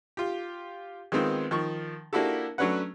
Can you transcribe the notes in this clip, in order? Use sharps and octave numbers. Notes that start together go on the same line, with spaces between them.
F4 G4
D#3 G#3 B3 C4 F4
D#3 F3 C#6
A#3 D4 E4 F#4 G4 A4
F#3 A3 C#4 D4 B4 F#5